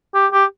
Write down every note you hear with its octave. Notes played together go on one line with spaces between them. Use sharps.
G4
G4